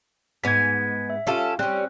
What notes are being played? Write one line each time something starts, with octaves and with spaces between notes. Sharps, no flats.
G#2 B3 G#5 G#6 B6
E5
C#4 F4 G4 A4
G3 C4 C#4 F#6